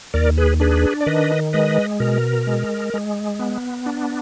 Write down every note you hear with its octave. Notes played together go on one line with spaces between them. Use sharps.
D#2 A#4 D5
G#4 B4
D4 G#4 B4
D5
D#3 B4 D#5
G#3 B4 D#5
B2 A#4
G#3
G#3
B3
D4